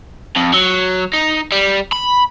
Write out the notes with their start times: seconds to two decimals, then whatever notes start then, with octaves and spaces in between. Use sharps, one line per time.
0.36 F2
0.54 F#3
1.13 D#4
1.52 G3
1.92 B5